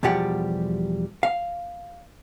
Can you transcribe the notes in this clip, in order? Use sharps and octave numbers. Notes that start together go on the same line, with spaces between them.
E2 B2 F3 G3 G4 F#5
F5